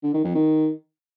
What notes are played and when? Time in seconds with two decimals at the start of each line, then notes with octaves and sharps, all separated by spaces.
0.03 D3
0.14 D#3
0.24 F2
0.35 D#3